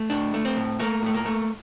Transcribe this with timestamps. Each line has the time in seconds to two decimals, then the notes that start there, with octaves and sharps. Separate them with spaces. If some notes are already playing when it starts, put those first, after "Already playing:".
Already playing: A3
0.10 A2 D4
0.34 A3
0.45 C4
0.57 A2
0.79 A3 A#3
1.02 A2 A3
1.14 A#3
1.26 A3